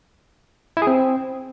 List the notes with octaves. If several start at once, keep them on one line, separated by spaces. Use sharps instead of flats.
E4
G#4
C4